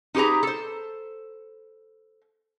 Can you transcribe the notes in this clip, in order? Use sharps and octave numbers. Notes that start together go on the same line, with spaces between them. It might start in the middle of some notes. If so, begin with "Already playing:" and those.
D#4 G4 G#4 B4 A#5
A4 C5